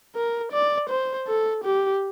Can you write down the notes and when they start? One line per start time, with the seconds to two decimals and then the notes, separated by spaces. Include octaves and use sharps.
0.16 A#4
0.52 D5
0.90 C5
1.28 A4
1.64 G4